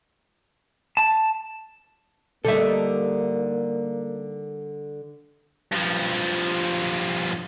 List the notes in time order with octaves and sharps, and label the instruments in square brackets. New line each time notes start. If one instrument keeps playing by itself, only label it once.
[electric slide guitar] A5
[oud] D3 G3 D#4 [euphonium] A#3 [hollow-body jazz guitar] A4 E5
[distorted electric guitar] G2 F3